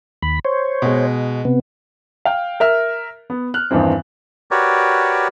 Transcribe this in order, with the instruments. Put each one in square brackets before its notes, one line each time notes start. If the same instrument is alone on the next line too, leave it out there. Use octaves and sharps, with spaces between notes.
[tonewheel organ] D#2 B5
C5 C#5
[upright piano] B2 G#3
[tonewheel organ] C3 B3
[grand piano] F5 G5
A#4 E5 F6
B3
F6 F#6
E2 G2 D#3 E3 C4
[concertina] F#4 G4 A#4 B4 C#5 D5